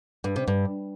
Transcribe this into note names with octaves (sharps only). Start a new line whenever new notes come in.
G2
C3
G2